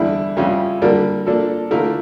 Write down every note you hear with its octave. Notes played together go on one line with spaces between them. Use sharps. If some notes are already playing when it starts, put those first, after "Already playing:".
Already playing: E2 D3 G3 D4 E4
F2 C#3 G3 C#4 F4 G4
D3 G3 A#3 D4 A#4
F3 A#3 D4 A4
D3 A3 E4 F4 A#4